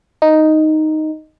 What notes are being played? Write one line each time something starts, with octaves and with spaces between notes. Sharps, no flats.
D#4